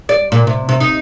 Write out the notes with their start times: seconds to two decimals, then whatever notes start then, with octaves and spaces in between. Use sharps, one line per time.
0.09 D5
0.32 A#2
0.47 C3
0.69 C3
0.80 D#4